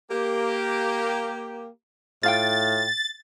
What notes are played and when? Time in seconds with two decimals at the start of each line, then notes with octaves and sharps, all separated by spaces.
0.11 A#3 G4
2.23 A2 F4 F5 G5 A6